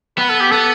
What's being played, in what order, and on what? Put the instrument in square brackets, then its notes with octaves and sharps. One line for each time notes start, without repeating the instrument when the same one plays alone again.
[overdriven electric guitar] B3 [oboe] B4
[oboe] A4
G4
[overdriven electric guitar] B3 [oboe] A4